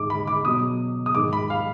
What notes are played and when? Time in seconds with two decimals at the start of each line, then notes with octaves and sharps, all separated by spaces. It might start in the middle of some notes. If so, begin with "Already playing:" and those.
Already playing: G#2 D#3 G#3 D6
0.10 B5
0.27 D6
0.45 B2 F#3 D#6
1.06 D#6
1.15 G#2 D#3 G#3 D6
1.33 B5
1.50 F5